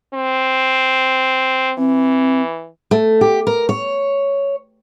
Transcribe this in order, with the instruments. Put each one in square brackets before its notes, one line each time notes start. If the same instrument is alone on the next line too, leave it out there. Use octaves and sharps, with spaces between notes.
[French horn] C4
[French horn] E3 [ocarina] C4
[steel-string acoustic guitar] A3
G4
A#4
C#5